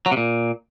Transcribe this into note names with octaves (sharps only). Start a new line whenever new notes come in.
F#3
C3
A#2